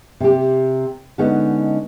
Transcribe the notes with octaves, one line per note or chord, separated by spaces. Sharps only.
C3 G4
D3 G#3 B3 C#4 D#4